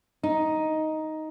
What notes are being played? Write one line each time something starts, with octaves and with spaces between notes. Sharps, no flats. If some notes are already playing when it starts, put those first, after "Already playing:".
D#4